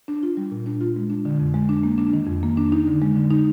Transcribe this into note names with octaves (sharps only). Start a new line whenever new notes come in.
D4
F4
G3
A#2
D4
F4
G#3
D4
D3
F2
G#3
D4
A#3
D4
D#3
F2
A#3
D4
D#4
D3
G#3
D3
D#4